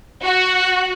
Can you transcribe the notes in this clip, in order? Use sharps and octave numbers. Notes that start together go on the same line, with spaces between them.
F#4